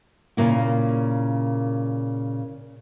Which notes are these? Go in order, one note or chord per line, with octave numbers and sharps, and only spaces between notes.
A#2 C#3 A#3 E4